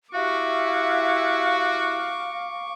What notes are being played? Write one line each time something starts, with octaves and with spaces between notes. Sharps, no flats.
E4 F#4 G4 E5 F5 C#6 D6